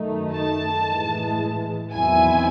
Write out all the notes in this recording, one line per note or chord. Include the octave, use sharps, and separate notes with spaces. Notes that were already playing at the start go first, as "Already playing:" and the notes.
Already playing: F#2 D#3 A3 D#4
A5
A2 E3 G#3
E2 D#3 F#3 C4 E4 G#5